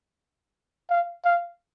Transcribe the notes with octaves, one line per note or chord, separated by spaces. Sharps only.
F5
F5